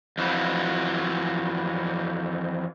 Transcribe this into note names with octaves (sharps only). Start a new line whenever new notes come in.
F2 E3 F#3